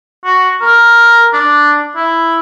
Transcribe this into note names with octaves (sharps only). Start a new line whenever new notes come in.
F#4
A#4
D4
E4